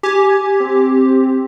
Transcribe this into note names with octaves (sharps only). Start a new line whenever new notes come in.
G4 G#5
C4